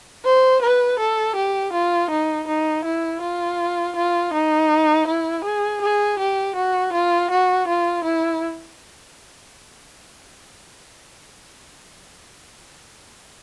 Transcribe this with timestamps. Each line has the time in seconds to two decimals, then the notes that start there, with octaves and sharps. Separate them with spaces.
0.25 C5
0.62 B4
0.99 A4
1.36 G4
1.73 F4
2.10 D#4
2.47 D#4
2.85 E4
3.22 F4
3.96 F4
4.33 D#4
5.07 E4
5.44 G#4
5.82 G#4
6.19 G4
6.56 F#4
6.93 F4
7.30 F#4
7.68 F4
8.04 E4